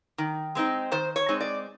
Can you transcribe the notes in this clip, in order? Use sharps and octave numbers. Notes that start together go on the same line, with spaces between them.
D#3
G#3 C4 D#4
D#3 C5
C#5
G#3 C4 D#4
D5